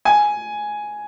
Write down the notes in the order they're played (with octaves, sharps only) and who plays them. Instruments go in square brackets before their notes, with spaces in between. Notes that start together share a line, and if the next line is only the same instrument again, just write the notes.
[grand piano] G#5